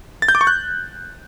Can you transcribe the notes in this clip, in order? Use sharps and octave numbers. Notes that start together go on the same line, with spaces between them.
A6
G6
D6
C#6
F#6